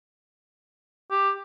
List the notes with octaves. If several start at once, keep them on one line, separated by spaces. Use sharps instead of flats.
G4